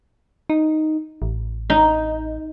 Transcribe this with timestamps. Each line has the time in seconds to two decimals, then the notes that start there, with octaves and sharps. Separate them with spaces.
0.50 D#4
1.22 A1
1.70 D#4